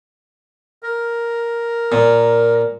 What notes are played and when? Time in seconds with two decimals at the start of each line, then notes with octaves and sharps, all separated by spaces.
0.83 A#4
1.92 A#2